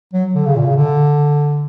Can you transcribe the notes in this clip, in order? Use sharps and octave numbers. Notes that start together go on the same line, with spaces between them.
F#3
D3
C#3
A#2
C#3
D3